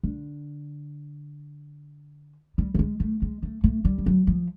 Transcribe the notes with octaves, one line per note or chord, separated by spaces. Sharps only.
D3
G3
A3
G#3
A3
G#3
A3
A3
G3
F3
F#3
F3